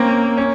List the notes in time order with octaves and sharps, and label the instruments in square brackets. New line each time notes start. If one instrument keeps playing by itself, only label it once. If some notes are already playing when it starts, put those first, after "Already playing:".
Already playing: [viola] A#3 [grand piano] C4 C#4
[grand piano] C#4